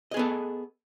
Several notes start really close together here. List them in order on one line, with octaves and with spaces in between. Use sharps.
D#5 G#4 B3 A4